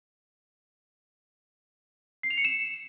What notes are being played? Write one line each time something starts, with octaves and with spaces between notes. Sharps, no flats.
C7
F7
C#7
E7